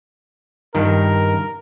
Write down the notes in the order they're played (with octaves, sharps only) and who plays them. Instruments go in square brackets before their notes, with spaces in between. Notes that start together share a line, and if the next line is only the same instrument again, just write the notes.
[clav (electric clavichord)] G2 D#3 [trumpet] A#4